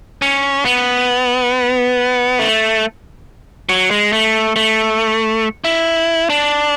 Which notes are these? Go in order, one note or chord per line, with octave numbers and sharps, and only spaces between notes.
C#4
B3
A3
F#3
G#3
A3
A3
E4
D4